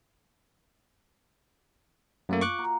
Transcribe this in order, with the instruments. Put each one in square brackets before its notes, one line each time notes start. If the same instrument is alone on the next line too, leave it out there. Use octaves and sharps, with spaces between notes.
[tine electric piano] F#2 A3 A#3 [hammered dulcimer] F4
[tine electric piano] C#6 D6 F#6
[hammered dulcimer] A#3 F#5 A#5